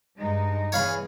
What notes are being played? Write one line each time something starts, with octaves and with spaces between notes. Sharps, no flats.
G2 G#3 D#4
E2 B2 G#4 C#5 F5 B5